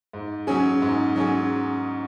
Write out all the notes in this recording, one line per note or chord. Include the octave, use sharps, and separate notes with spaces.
G#2
F#3 C#4 G#4
G#2
F#3 C#4 G#4